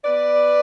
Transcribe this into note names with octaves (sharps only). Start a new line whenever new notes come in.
B3 B4 D5